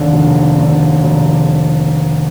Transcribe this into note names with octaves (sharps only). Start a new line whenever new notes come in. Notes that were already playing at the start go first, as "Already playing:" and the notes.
Already playing: F1 D#2 D3
F1
D#2 D3
F1